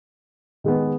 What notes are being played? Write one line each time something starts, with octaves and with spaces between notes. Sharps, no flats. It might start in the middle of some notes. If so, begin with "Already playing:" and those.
D#3 G#3 B3